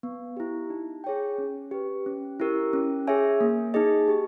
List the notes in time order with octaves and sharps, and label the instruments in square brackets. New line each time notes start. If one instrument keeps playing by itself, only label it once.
[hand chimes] B3
E4 G4
D#4
G#4 C#5 G5
C#4
G4 B4
C#4
E4 G4 A#4
C#4
G#4 C#5 E5 G#5
A#3
D#4 G#4 D#5
G4